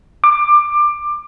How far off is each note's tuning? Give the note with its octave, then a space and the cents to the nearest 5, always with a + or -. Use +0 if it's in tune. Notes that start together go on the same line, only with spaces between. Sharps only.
D6 +20